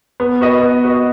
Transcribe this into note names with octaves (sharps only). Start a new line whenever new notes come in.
B3
F#4 B4 D#5
B3
F#4 B4 D#5